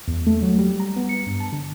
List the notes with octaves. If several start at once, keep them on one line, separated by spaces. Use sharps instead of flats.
E2
A3
F#3
G3
A#5
B3
C#7
G2
A5
D3